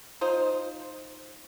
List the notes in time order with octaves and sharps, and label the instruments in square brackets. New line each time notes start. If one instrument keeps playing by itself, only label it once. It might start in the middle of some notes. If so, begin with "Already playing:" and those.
[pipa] D#4 F4 C5